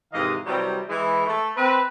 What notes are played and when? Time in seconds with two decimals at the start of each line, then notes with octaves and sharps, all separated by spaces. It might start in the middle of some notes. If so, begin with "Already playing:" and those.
0.13 G#2 C3 D#3 E3 D#5 F5
0.45 C3 E3 F#3 G3
0.89 E3 G#3 E4
1.26 A3
1.56 C4 B4